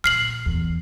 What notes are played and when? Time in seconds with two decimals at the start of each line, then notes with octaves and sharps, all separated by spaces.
0.04 A#2 F6 C7 F#7
0.46 E2